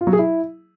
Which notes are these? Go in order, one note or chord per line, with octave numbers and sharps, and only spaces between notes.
F4
F#3
G#4
E4